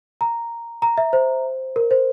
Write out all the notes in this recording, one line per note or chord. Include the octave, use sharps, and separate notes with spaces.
A#5
A#5
E5
C5
A#4
C5